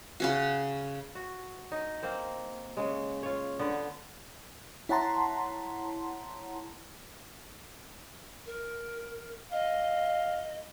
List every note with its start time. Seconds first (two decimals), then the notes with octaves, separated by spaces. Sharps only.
0.20 C#3 C#4 F#4
1.15 F#4
1.72 D#4
2.03 A#3 C4 C5
2.77 C#3 G#3
3.23 F4 C#5
3.59 D3 B3
4.89 E4 C#5 F#5 A5 A#5 C6
8.46 A#4
9.52 D#5 F5